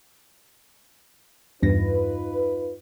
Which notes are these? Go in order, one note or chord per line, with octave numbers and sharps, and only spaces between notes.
E2 G2 D#4 F4 B4 A#6